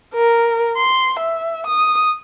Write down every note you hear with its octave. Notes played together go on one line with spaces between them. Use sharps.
A#4
C6
E5
D#6